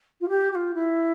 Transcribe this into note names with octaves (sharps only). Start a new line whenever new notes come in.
F4
G4
G4
F4
E4